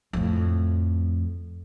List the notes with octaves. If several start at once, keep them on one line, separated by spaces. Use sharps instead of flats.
F2 A2